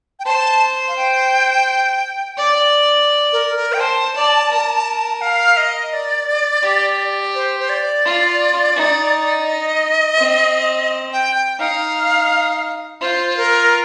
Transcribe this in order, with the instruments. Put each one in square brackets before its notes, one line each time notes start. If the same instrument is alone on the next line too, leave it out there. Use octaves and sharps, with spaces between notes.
[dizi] G5
[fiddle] C5 [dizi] A5
[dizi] F5
G5
[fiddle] D5
[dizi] A#4
A#4
G5
[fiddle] C5 [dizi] A5
[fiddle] D5
A#4
[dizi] F5
D#5
D5
[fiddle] G4
[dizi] C5
C5
D5
[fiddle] F4
D#4
[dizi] D#5
[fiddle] C4
[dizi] G5
G5
[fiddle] D#4 [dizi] F5
[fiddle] F4 [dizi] C5
[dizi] A#4